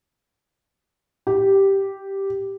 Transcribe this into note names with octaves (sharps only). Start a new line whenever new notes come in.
G4